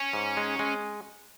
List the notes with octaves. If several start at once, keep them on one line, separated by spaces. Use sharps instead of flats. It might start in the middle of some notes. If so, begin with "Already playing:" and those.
Already playing: C#4
G#2
G#3
G#3